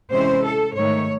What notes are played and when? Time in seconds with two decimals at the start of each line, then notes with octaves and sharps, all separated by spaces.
0.10 C3 E3 G#3 C#4 E4 C5
0.42 A4
0.75 G#2 D#3 A3 C#5